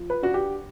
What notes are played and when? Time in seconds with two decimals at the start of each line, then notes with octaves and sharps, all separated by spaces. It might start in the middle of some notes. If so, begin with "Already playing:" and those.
Already playing: F3
0.10 B4
0.23 D4 F#4
0.34 G4